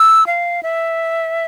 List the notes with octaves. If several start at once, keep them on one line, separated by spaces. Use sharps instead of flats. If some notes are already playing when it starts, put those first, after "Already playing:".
Already playing: E6
F5
E5